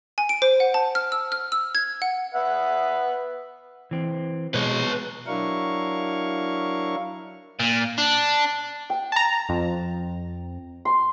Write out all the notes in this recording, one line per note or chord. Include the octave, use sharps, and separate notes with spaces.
G#5
D7
C5
F#5
A5
F6
E6
F6
E6
G#6
F#5
B4 E5 F#5
E3 C4
B2 G#3 B4 C#5
F#3 D4 E4 A#4 F5 C#6
A#2
D4
G5
A5 A#5
F2
C6